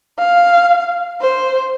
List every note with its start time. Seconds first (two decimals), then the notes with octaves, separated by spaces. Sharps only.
0.19 F5
1.21 C5